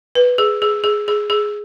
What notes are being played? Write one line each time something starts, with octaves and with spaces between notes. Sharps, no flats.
B4
G#4
G#4
G#4
G#4
G#4